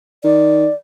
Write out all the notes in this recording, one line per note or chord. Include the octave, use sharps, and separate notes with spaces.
D#3 D5